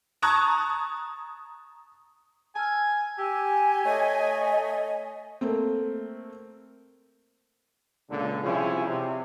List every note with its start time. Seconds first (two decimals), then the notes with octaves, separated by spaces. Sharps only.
0.22 A5 A#5 C#6 D#6 F#6 G#6
2.55 G#5 A5 E6 F6
3.18 G4 G#5 A5 E6
3.85 A3 C#5 D#5
5.41 A3 A#3 C4
8.10 C#2 A#2 D3
8.44 C3 F3 G3 C#4 E4 G#4
8.87 C3